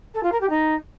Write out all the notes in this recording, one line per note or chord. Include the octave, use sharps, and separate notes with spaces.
A4
F4
A#4
G4
D#4